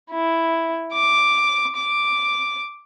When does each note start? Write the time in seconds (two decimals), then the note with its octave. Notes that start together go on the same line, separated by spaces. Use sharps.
0.11 E4
0.93 D6
1.76 D6